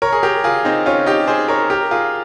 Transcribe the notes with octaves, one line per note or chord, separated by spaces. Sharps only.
A#4 C#5
G#4
G4 A#4
F4 G#4
C4 D#4
C#4 F4
D#4 G4
G#4 C5
A#4 C#5
G4 A#4
F4 G#4